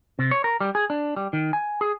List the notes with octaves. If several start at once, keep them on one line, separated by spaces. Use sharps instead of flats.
C3
C#5
A#4
G3
G#4
D4
G3
D#3
G#5
G#4